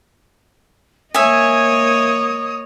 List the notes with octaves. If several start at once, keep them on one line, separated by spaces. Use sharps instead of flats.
A#3 C#5 D#5 E5 G#5 D#6